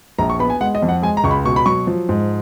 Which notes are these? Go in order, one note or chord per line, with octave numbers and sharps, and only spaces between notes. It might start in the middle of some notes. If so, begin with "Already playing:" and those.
A#1 A#5
C#6
B3 B5
G#5
G#3 F#5
D#5
F2
F#5
G#3 G#5
A#5
C#2 C#6
B5
B2 C#6
B5
F#3 C#6
F3
G#2